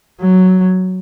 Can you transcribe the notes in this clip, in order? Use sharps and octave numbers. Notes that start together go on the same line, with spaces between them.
F#3